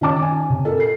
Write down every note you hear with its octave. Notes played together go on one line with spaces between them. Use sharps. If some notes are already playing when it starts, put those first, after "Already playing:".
D#3 C#4 A5 D6
G#5
C3
A4 A#4
C7